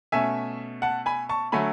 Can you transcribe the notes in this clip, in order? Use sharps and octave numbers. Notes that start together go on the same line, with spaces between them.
B2 A3 C#4 E5 G#5
F#5 A5
G#5 B5
A5 C#6
D3 F#3 A3 G#5 B5